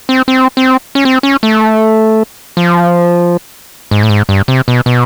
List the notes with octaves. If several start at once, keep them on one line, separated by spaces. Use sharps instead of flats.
C4
C4
C4
C#4
C4
C#4
A3
F3
G#2
A2
G#2
G2
C3
B2
B2